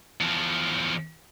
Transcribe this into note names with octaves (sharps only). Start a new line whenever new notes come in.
E2 F3